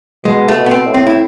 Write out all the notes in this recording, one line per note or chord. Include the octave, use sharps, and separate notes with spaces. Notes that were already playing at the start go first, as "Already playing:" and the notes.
B2 G#3
A3
B2
B3
C4
A2
C4
E4